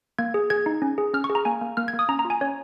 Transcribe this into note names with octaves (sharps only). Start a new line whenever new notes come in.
A#3 G#6
G#4
G#4 G#6
D#4
C#4
G#4
C#4 F6
C#6
G#4
A#5
A#3 G#5
A#3
A#3 F6
G#6
A#3
D#6
C#4 A#5
A#5
F4
G#5
C#4 C#5